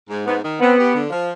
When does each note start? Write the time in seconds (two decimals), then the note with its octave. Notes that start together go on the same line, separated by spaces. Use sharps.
0.09 G#2
0.26 G#2 B3
0.43 D#3
0.60 B3 C4
0.77 G4
0.93 D3
1.10 F3